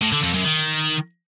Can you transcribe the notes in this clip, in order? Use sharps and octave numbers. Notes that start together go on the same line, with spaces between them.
A2
D3
F2
F#2
D#3